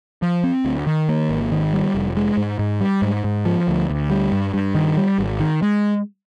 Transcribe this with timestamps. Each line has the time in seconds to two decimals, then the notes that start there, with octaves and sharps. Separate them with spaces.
0.22 F3
0.44 C4
0.65 D2
0.87 D#3
1.09 A#3
1.29 G#1
1.52 D#3
1.73 G3
1.95 F1
2.17 G#3
2.37 G#2
2.59 G#2
2.81 G3
3.02 G#2
3.24 G#2
3.45 F3
3.68 D2
3.90 D2
4.10 G3
4.32 G2
4.54 G2
4.75 D#3
4.97 G3
5.19 G#1
5.40 D#3
5.62 G#3